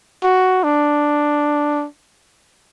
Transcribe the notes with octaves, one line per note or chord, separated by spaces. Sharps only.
F#4
D4